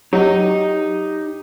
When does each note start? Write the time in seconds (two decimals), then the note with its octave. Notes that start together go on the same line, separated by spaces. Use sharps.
0.13 F#3 D#4 G4 D#5